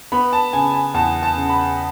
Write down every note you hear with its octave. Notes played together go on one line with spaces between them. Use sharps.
B3 B5
A5
C#3 G#5
G#5
E2 A5
A5
C#3
B5